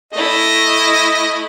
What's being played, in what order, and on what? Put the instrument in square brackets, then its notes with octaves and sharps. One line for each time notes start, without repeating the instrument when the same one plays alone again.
[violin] A3 E4 [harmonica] D#5